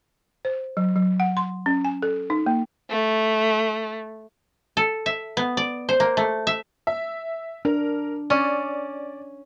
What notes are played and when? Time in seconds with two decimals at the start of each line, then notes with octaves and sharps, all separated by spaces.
0.45 C5
0.77 F#3
0.96 F#3
1.20 F#5
1.37 C6
1.66 C#4
1.85 G#5
2.02 A4
2.30 D#4
2.46 A#3
2.89 A3
4.77 A4
5.06 E5
5.37 B3
5.57 D5
5.89 C5
6.00 A#3
6.17 A3
6.47 E5
6.87 E5
7.65 D4 A#4
8.30 C#4 D5